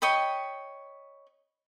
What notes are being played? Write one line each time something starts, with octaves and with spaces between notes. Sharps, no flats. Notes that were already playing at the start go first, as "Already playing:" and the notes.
C#5 D#5 G5 B5